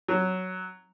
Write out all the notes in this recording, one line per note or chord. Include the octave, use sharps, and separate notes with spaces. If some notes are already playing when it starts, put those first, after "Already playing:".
F#3